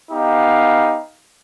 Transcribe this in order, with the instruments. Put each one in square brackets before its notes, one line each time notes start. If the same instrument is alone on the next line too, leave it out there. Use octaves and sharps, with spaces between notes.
[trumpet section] B3 D#4 G4 F5